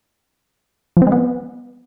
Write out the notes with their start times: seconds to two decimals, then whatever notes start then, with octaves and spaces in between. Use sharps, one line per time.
0.97 F3
1.02 C4
1.07 G#3
1.12 B3